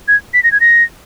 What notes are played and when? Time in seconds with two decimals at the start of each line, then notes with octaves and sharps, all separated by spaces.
0.08 G#6
0.34 B6
0.44 A#6
0.52 G#6
0.61 A#6